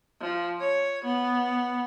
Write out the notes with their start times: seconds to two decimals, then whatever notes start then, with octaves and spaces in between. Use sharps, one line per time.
0.21 F3
0.60 C#5
1.05 B3